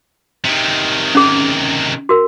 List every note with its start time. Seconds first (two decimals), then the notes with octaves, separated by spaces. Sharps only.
0.45 C3 D#3
1.15 C#4 G#4
2.09 F#4 A#4